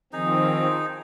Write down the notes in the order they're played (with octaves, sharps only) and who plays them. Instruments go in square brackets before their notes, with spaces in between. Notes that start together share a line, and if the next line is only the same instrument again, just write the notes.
[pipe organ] D#3 F3 C4 [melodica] D#4 G#4